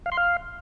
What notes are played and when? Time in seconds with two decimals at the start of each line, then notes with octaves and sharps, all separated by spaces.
0.06 F5
0.12 C6
0.17 F5